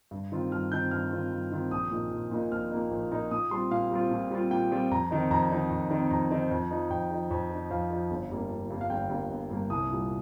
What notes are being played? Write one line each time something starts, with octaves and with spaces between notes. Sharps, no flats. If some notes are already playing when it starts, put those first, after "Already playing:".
G2
D#3 C4 F4
G2 F6
D#3 C4 F4 G6
G2 F6
D#3 C4 F4
G2
D#3 C4 F4
A#1 D#6
A#2 A#3 D#4
A#1
A#2 A#3 D#4
A#1 F6
A#2 A#3 D#4
A#1
A#2 A#3 D#4
A#2 D#6
G3 C4 F4 C6
A#2 F5
G3 C4 F4
A#2
G3 C4 F4
A#2 G5
G3 C4 F4
F2 A#5
D#3 C4 D#4
F2 A#5
D#3 C4 D#4
F2
D#3 C4 D#4
F2 A#5
D#3 C4 D#4
F2
F3 D#4
F2 G5
F3 D#4
F2
F3 D#4
F2 F5
F3 D#4
G1
G2 G3 A#3
G1
G2 G3 A#3
F5
G1 G5
G2 G3 A#3
G1
G2 G3 A#3
C2 D#6
A#2 G3